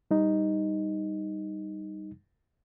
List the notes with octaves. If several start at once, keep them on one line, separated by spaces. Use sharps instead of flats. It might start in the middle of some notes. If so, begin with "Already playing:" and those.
G3 D#4